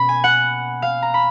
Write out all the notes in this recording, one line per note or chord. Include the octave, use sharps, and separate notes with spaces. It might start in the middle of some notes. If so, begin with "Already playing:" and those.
Already playing: B2 A#3 C#4 B5
G#5
F#5
F5
A#5
B5